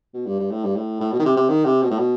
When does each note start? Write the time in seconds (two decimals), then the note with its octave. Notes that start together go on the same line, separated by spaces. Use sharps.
0.14 B2
0.27 G2
0.39 G2
0.51 A2
0.65 G2
0.76 A2
1.00 A2
1.12 B2
1.19 D#3
1.25 C3
1.37 C3
1.49 D#3
1.65 C3
1.83 B2
1.91 A2
1.99 B2